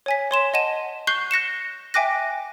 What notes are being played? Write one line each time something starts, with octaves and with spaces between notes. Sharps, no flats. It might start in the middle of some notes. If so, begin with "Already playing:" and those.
C#5 G#5 B6
C#5 C6 E7
D#5 F#5 A5 D#7 E7
C#6 F#6 G6 C7 G7
F#6 A#6 C#7 E7
E5 G5 G#5 D6 F#6 A#6